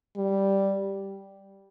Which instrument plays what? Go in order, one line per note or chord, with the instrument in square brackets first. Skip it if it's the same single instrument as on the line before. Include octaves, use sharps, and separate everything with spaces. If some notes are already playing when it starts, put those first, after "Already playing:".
[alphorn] G3